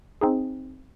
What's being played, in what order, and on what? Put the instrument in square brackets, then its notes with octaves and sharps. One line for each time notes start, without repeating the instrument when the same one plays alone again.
[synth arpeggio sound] C4 D#4 G#4